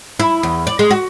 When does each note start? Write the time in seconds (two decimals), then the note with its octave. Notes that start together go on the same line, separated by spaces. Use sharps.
0.19 E4
0.43 E2
0.67 D5
0.79 G#3
0.91 F#4